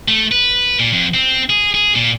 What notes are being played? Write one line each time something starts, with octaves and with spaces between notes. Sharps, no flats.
A3
B4
A#2
F2
C4
G#4
G#4
A#2